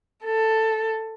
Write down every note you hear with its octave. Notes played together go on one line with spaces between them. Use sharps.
A4